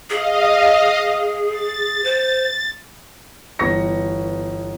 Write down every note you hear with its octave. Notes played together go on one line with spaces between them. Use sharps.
G#4 D#5 F5
A6
C5
G1 E3 B3 C#6 A#6 C#7